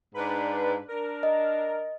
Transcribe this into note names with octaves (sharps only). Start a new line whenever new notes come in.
G#2 D4 B4
D4 A#4
D#5